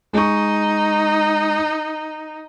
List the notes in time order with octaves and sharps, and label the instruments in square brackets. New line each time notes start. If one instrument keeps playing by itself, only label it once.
[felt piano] G#3 C#6 [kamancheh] D#4